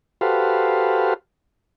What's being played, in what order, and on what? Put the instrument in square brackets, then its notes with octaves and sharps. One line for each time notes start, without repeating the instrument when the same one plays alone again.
[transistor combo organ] F#4 G4 A4 B4 C5 F5